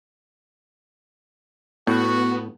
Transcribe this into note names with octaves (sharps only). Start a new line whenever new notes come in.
A2 B3 F#4